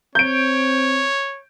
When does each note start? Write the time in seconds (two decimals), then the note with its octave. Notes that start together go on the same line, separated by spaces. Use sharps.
0.15 C4 C#5 G6 D7